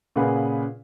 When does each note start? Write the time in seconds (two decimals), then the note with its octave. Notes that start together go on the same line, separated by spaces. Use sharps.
0.16 A#2 C#3 G#4 B4 F#5